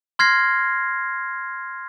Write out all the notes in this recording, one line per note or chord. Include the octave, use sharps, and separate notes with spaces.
C6 F6 G#6 A#6 C7